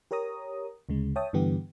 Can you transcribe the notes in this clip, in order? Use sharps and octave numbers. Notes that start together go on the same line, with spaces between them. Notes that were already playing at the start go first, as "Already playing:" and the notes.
G4 A#4 C#5 A#5 D#6
D2 C#3 G#3
C#5 E5 G5 A5 D#6
G2 D3 E3 B3 G4